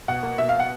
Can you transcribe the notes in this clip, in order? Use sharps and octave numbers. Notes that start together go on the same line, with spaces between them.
B2 F#5
A#3
B2 E5
F5
B3
F#5